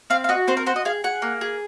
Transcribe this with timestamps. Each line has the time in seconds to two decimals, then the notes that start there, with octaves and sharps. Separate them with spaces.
0.10 C4 F5
0.24 F5
0.29 F#4 D#5
0.48 C4 C5
0.57 A#4
0.66 F#4 C5
0.76 D#5
0.85 G#4 F5
1.04 G#4 F#5
1.22 A#3
1.41 G#4